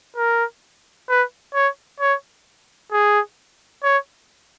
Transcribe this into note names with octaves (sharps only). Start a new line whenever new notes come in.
A#4
B4
C#5
C#5
G#4
C#5